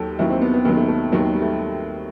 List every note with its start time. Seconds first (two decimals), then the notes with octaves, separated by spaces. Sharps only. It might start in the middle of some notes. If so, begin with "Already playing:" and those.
Already playing: D#2 D#3 F#3 G4 A4
0.19 D#2 D#3 F#3 E4
0.30 C4
0.42 B3
0.54 B3
0.65 D#2 D#3 F#3 B3
0.77 A3
0.88 A3
1.12 D#2 D#3 F#3
1.35 G3
1.42 A3